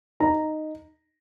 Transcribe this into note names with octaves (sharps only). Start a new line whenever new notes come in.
D#4 A#5